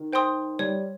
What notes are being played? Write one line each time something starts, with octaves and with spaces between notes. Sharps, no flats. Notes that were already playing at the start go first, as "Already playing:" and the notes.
Already playing: D#3
C5 G5 C6 D#6
G3 C#5